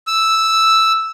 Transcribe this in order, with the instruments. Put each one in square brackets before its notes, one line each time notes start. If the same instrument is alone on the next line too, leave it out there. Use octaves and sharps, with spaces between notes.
[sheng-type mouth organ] E6